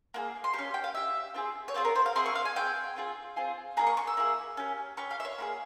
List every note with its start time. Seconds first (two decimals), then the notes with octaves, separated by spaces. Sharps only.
0.14 A#3 E4 G#4
0.44 C6
0.54 C#4 G4 C#6
0.74 G5
0.84 F5
0.94 C#4 G4 E5
1.34 C4 F4 G#4
1.68 C#5
1.74 C4 F4 G#4 C5
1.85 A#4
1.96 C5
2.06 F5
2.16 C4 E4 G#4 C6
2.26 C#6
2.35 F5
2.45 G#5
2.56 C4 E4 G#4 G5
2.96 C4 F4 G#4
3.36 C4 F4 G#4
3.77 A#3 E4 G#4 A#5
3.87 C#6
3.97 C#6
4.07 E6
4.17 A#3 E4 G#4
4.57 C#4 G4
4.97 C#4 G4 C#6
5.11 F5
5.20 E5
5.25 C#5
5.38 A#3 E4 G#4